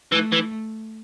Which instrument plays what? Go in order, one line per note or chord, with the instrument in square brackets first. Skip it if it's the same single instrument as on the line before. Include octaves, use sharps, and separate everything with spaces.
[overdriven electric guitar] E3 [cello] A3
[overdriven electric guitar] E3